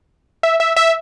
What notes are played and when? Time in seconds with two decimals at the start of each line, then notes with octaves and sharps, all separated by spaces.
0.43 E5
0.60 E5
0.76 E5